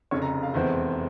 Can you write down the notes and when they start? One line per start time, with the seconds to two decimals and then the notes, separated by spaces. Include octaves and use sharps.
0.11 F1 F2 C#3 C#5
0.22 A#5
0.43 F5
0.54 F1 E2 E3 G#3 C4 C5